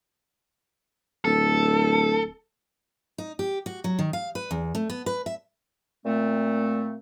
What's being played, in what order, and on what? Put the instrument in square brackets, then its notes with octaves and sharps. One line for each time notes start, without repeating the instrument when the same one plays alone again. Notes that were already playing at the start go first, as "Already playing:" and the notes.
[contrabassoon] D1 [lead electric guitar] A4
[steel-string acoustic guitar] D#4
G4
F#4
F#3
D#3
F5
B4
E2
A3
B3
B4
E5
[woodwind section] A#2 A3 C4